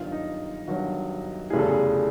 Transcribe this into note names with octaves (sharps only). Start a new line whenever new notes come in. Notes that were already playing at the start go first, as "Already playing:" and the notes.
Already playing: G1 G2 D#3 F#3 F4
D#4
G1 G2 D#3 F#3 F#4
F1 E2 C#3 E3 G3 G#4
A4
G#4